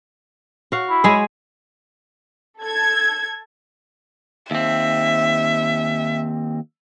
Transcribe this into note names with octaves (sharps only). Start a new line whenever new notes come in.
F#4 F5
E4
G#3 G#4
A4 G#6
D#2 C4 E5